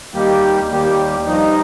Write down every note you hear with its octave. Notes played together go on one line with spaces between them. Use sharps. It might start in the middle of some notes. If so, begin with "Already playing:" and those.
D#2 D#3 G3 A#3 G4
D#2 D#3 G3 A#3 G4
G2 F3 D#4